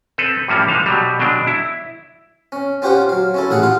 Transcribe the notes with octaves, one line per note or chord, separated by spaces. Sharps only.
C4 A4 B4
A2 E3 F3 G3 A#3 C#4
G#3 D#4 C5 F5
B2 F#3 G3
B2 F#3 G#3 D4 G5
E4
C#4
C#4 F4 G4 C5 F#5 G5
F#3 F5
C#4 E4 A4
A1 G#4 F5 F#5
F4 F5 F#5